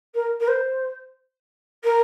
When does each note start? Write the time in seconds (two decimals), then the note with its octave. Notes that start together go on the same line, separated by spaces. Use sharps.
0.14 A#4
0.40 A#4
0.47 C5
1.84 A#4